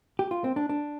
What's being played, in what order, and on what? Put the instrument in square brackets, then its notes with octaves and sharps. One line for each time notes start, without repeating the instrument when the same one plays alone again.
[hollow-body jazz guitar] G4
F4
C4
D4
D4